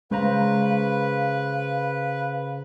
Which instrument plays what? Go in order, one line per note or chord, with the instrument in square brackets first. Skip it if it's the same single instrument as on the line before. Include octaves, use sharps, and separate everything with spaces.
[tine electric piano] C#3 C5 A#5 [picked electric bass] G#3 [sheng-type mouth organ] B4 [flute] F5